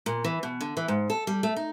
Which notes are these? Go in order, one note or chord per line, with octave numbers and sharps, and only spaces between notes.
A#2
E3
B2
D3
E3
G#2
A4
G3
A3
D#4